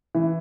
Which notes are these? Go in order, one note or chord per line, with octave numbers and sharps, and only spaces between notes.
E3